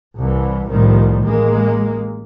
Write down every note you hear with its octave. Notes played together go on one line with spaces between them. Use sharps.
C2 E3
C2 A2 D#3 F3 G3
A1 G#3 A#3